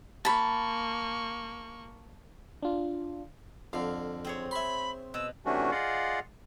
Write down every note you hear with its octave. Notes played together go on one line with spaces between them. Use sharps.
A#3 A5 B5 C#6
D4 F4
F2 D3 F5
C4 G#4 C#5
E5 B5 C6
B2 E6
C3 E3 A3 C#4 D4 F#4
F4 G#4 D5 D#5 F5 F#5